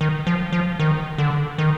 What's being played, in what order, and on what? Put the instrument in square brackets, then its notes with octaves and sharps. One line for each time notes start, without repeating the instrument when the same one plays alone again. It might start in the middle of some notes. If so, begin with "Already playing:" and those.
[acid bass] D#3
F3
F3
D#3
D3
D#3